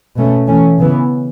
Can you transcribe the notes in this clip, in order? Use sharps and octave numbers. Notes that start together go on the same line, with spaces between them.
B2 A3 C#4
E3 A3 C#4
C#3 E3 B3